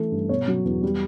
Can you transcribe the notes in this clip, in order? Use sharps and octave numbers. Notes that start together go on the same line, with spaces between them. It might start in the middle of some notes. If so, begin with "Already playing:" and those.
Already playing: E3 A3 A4
G2
B2 C#5
F#3
E2
G3